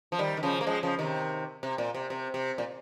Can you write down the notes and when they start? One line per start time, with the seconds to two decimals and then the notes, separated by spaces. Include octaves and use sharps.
0.12 F3
0.19 D#3 G3
0.37 D#3
0.43 C#3 F3
0.61 A#3
0.66 F3 G#3
0.83 C#3 F3
0.99 C3 D#3
1.63 C3
1.78 A#2
1.95 C3
2.10 C3
2.34 C3
2.58 A#2